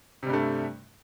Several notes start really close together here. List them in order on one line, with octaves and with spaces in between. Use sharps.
C3 G3 G2 A3